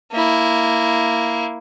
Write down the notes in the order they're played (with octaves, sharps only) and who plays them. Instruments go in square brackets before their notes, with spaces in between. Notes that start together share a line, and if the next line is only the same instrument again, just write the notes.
[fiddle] A#3 E4